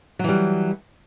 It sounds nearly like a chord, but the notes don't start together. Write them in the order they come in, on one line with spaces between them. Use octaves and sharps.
F#3 E3 G3